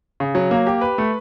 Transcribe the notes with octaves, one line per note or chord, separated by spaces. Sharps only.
C#3
F#3
A#3
G4
B4
A3